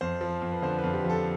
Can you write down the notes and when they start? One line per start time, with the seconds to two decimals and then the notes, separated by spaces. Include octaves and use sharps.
0.01 F2 C5
0.21 F3
0.42 F2
0.52 B4
0.62 D3 C5
0.78 B4
0.84 F2
0.94 G4
1.04 F3
1.10 A4